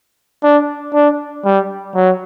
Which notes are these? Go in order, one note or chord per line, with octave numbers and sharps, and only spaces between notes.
D4
D4
G3
F#3